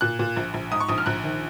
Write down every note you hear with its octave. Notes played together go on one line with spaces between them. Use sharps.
A#2 F#6
A#2
A#1
A#1
G#2 D#6
C#6
A#1 D#6
F6
A#1 F#6
D#3